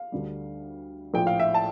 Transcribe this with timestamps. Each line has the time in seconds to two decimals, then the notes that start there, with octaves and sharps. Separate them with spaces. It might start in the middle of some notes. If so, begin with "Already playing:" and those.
Already playing: F5
0.12 D2 D3 G3
1.14 A#1 A2 F3 G5
1.27 F5
1.40 E5
1.54 A5